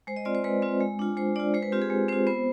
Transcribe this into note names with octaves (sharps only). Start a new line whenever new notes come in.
G#3 C5
D#5
C4 F4 D5
C5
G#3 B4
C4 F4
G#3
D4 F4
G#3 C5
D4 F4 D5
G#3 C5
B4
C4 F4 G4
G#4
G#3
C4 F4 C5
B3 C5